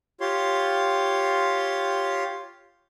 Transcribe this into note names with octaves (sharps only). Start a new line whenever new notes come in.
F4 G4 C#5 C6